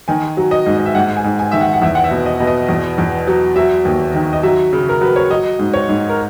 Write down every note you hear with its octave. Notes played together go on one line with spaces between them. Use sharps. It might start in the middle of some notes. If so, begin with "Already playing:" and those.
D#3 G#5
F#3
D#5
G#2
D#5
E5
G#2 F#5
G#5
G#2
G#5
D#3 E5
F#5
F#5
E2 E5
F#5
E5
B2
D#5
B2
D#5
E2
E2
F#3
F#3 E5
D#2
D#3
D#5
F#3 E5
C#3
A#4
F#3 B4
C#5
F#3 D#5
G#2
C#5
G#2
A#4